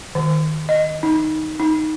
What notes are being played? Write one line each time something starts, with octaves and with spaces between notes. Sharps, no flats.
D#3
D#5
D#4
D#4